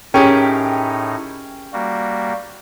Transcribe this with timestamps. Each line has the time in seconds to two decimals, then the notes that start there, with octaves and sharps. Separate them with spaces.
0.14 A2 C#4 D#4 G4 G#4 A#4 G5
1.73 G3 A#3 F#4